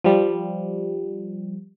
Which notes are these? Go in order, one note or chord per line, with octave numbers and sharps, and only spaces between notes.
F3 G3